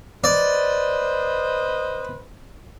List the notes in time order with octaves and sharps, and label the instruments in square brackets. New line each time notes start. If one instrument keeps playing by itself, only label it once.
[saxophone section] B4 C5 D#5 [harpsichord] D5